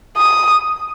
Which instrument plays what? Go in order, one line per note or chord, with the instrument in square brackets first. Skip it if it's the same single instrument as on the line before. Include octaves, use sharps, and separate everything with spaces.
[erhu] D#6